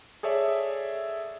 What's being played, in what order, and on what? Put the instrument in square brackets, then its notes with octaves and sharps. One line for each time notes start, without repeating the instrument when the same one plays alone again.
[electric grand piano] G#4 A4 C#5 D5 E5